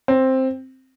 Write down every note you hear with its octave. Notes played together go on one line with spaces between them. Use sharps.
C4